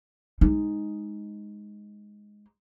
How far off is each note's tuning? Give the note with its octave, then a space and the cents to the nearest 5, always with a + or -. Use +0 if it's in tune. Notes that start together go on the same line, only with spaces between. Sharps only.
G#3 +0 D#4 +0